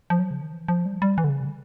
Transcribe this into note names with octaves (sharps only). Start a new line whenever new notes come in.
F3
F#3
C#3
D#3
E3
F3
G3
G3
E3
D3
C#3
C3
D3